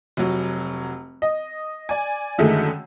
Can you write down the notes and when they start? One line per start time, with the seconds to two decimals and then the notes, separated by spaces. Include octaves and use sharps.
0.17 F1 F#3
1.22 D#5
1.89 D5 G#5
2.38 F#2 D3 D#3 G#3 A3